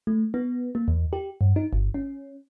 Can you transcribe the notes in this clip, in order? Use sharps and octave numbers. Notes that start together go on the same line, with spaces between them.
A3
B3
A#3
E2
G4
G2
D#4
G1
C#4